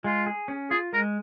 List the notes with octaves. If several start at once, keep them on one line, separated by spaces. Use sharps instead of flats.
G#3 F4
G#4
C#4
F4 G#4
G#3 A#4